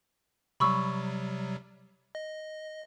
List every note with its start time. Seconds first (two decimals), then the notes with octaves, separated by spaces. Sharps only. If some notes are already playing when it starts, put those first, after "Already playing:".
0.60 C3 F#3 G3 B5 C#6 E6
2.15 D#5